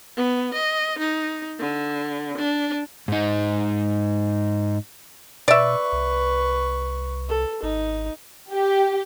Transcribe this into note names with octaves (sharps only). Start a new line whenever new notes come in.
B3
D#5
D#4
D3
D4
G#2 D#4
B2 B4 D5 E5 C#6
C2
A4
G#1 D#4
G4